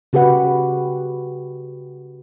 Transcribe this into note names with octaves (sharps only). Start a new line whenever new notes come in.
C#3 F#4 G4 B4 F#5